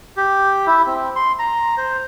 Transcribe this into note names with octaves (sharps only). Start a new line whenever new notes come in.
G4
E4
C4
C6
A#5
C5